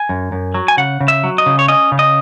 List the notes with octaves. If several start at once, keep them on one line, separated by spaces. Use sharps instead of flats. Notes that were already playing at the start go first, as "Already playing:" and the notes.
Already playing: G#5
F#2
F#2
F#3
G#5
C#3 F#5
C#3
E5
F#3
D#5
C#3
C#5
C#4 D#5
C#3
D#5